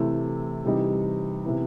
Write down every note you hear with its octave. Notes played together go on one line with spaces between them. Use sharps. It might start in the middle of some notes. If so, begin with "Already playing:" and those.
Already playing: C3 E3 A3 E4
C3 E3 G3 D#4
C3 E3 B3 E4